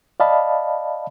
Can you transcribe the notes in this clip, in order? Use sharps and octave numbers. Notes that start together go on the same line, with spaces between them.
D5 D#5 F5 A5 B5